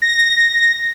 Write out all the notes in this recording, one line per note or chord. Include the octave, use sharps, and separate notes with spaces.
A#6